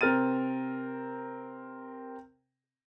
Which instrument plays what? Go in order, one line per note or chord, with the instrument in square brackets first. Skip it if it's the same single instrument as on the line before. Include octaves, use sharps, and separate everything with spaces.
[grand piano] C3 C4 A#4 F6 A6 D#7